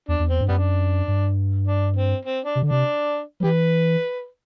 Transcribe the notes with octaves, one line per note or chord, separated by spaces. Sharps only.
E2 D4
E2
C4
G2
F#2 G3 B3 D4
G2
D4
C4
C4
D4
C3
D3
D4
C3
F#3
E3 G4 B4